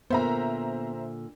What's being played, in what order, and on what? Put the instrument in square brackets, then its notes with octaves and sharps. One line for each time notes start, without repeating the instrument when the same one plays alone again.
[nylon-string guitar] A#2 D3 [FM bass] B3 [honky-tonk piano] C5 E5 A#5